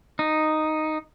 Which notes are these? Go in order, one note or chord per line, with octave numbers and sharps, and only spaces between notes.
D#4